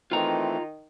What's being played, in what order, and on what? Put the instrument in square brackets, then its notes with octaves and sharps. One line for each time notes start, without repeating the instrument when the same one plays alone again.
[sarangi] D#3 [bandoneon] E3 A3 C4 [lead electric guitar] F4 A#5